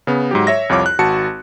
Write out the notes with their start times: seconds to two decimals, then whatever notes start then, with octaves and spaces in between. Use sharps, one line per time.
0.07 C#3 B3
0.31 G#2 F#3 G4
0.47 C#5 E5 A#6
0.69 C2 F2 F4 C#5 D6
0.86 F#6
0.99 G#1 F#4 A5 C#7